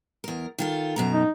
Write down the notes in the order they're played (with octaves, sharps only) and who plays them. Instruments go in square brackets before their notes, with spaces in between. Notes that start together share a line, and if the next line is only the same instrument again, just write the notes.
[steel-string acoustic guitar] E2 A#4
D#3 F4 A4
F#2 B2 A#5
[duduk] D#4